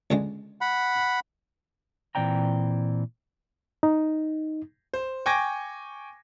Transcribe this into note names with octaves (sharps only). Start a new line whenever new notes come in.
C#2 D3 G#3
F#5 B5
A#2 E3 C4 D5 G5 A#5
D#4
C5
G5 G#5 C#6 D6 G#6 A#6